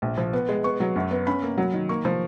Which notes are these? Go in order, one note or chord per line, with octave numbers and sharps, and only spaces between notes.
A#1
F3
B3
G#3
B3 C#6
F#3
F#2
B3
C#4 B5
A#3
F#3
D#3
A#3 C#6
F3